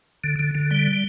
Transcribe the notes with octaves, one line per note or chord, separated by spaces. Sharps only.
D3
D3
D3
G3